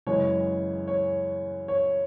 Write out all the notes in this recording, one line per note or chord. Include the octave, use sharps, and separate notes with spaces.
F#2 C#3 E3 G#3 C#5
C#5
C#5